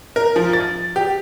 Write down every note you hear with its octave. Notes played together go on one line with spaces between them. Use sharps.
A#4
F3
A6
G4